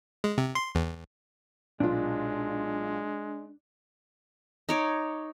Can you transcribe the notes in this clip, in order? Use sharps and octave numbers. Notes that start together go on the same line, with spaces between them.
G#3
C3
C6
E2
B1 A#2 G#3 D4 F4
D#4 C#5 D6